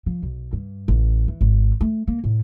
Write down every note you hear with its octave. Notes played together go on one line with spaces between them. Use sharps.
F3
B1
G2
A1
E3
G#1
A3
A#3
A2